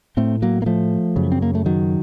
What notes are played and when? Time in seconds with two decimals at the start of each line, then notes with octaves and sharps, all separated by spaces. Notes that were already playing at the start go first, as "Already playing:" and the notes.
0.17 A2 A3 C4
0.42 F#3 A#3
0.62 A#3
0.66 F3 A3
1.16 F#2 C#3
1.32 C4
1.42 A#3
1.55 A3
1.66 D#3 F#3